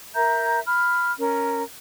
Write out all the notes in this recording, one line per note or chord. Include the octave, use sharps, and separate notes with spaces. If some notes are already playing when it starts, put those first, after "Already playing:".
A#4 E5 A#5 G6
B5 F6
C#4 A#4